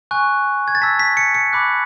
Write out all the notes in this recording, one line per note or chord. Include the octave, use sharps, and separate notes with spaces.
G#5 C#6 F#6
G#6
A6
A5 E6 B6
B6
C#7
C#7
B5 D6 F#6